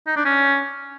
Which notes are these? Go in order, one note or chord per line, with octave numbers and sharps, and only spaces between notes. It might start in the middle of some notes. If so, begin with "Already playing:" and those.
D#4
D4
C#4